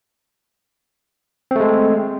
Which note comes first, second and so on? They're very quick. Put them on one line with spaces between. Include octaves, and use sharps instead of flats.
C4 A3 G#3